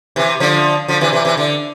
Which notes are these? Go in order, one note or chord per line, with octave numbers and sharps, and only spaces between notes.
C3 E3
D3 F3
D3 F3
C3 E3
C3 E3
C3 E3
D3